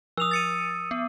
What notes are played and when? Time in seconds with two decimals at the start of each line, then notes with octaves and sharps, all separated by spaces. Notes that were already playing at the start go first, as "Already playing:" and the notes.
0.17 F3 D#6 E6 F7
0.31 A6 C#7 D#7
0.91 B3